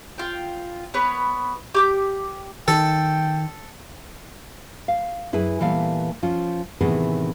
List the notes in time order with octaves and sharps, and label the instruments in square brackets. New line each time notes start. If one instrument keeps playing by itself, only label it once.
[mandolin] F4 G5
B3 B4 C#5
G4 D6 G6
[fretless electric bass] D#3 [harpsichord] A4 [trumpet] G5
[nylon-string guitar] F5
F#2 E4 G#4 B4 G#5
A#2 E3 G3 A3 B3 F5
F3 C#4 F4
A2 C3 D#3 E3 B3 G#4